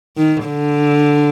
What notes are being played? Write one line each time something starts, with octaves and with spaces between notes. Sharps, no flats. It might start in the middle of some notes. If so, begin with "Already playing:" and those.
D#3
D3